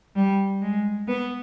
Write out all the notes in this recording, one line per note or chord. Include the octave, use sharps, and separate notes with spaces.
G3
G#3
B3